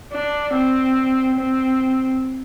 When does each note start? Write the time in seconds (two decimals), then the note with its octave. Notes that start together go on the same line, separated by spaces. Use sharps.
0.13 D4
0.55 C4
1.36 C4